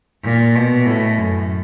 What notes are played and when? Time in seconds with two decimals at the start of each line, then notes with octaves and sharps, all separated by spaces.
0.24 A#2
0.55 B2
0.86 A2
1.18 F#2